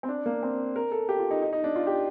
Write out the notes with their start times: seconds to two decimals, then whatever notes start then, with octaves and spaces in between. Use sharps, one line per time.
0.03 C4
0.09 D4
0.26 A#3
0.43 C4
0.76 A#4
0.92 A4
1.09 G4
1.19 F4
1.31 D#4
1.42 D#4
1.53 D#4
1.64 D4
1.76 F4
1.87 G4